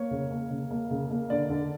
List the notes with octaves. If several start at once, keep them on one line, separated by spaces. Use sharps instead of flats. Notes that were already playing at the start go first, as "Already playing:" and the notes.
Already playing: A#3 C#5
C#3
A#3
C#3
A#3
C#3
A#3
D3 D5
D3